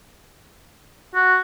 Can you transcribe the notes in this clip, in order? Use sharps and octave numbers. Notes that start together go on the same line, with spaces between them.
F#4